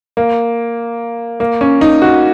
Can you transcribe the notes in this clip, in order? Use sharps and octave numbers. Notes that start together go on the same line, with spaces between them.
A#3
A#3
C#4
D#4
F#4